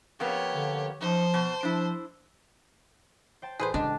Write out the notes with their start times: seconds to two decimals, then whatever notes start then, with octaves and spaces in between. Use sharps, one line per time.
0.20 F2 A#3 B3 G4 C#5
0.55 D3
1.01 F#2 F3 D#4 C5
1.34 B2 A5
1.63 F3 D4 E4
3.42 C5 G5 A5
3.60 A1 G#4 B4 C5
3.74 C#3 G#3 D4 G4 D#5